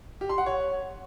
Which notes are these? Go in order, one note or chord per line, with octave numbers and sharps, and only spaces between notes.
G4
C6
F#5
C#5